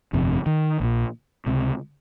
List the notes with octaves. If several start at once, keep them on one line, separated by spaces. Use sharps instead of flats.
G1 F2 C3
D#3
A#1 A#2
C#2 C3